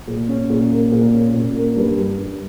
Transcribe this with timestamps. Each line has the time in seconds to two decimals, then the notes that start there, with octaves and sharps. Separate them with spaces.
0.07 A#2
0.29 C#4
0.50 A#2
0.71 A#3
0.92 A#2
1.13 C#4
1.34 A#2
1.55 A#3
1.76 G2
1.97 G3
2.18 G2